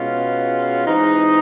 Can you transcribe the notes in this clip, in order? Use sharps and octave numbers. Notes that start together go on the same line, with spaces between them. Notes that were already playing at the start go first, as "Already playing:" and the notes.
Already playing: B2 G#3 C#4 F4
E3 G#3 C4 D#4